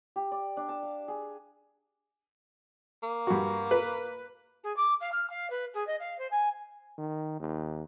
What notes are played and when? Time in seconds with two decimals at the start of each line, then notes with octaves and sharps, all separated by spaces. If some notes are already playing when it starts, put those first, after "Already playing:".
0.16 G4
0.32 D5
0.57 D4
0.69 A5
0.83 F5
1.08 G#4
3.03 A#3
3.27 G2 F#4
3.71 B4
4.63 G#4
4.76 D6
5.00 F5
5.12 F6
5.29 F5
5.50 B4
5.74 G#4
5.87 D#5
5.99 F5
6.18 C5
6.31 G#5
6.98 D#3
7.40 D#2